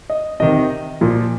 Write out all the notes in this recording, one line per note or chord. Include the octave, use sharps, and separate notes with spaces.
D#5
C3 D#3 D#5
A#2 F3